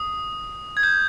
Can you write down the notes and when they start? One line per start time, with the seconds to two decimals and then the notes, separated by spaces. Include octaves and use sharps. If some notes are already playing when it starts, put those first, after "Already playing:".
Already playing: D#6
0.77 G#6
0.83 G6